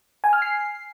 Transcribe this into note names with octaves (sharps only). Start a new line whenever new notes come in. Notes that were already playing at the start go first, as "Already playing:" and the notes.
G#5
F6
C7